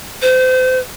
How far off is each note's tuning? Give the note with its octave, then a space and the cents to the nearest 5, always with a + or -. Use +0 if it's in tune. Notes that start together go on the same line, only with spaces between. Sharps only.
C5 -35